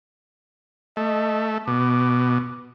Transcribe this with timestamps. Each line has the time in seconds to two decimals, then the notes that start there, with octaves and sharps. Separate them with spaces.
0.97 A3 D#5
1.67 B2 D6